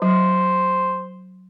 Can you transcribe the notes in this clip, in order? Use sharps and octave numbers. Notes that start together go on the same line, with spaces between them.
F#3 C5